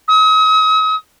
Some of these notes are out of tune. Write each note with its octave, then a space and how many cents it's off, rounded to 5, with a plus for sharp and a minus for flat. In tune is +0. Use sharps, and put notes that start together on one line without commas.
D#6 +45